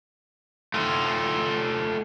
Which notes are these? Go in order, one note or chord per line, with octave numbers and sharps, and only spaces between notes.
A3 F4